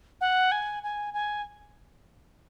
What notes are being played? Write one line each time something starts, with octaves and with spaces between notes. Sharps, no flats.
F#5
G#5
G#5
G#5